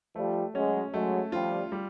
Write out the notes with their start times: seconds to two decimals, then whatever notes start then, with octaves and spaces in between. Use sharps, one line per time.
0.15 F3 G3 A3
0.54 F#3 G#3 C#4
0.93 F#3 G#3 A3
1.32 F3 G3 F4
1.72 G3